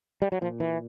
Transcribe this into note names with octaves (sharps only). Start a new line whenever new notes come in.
G3
F#3
A#2 F3
E3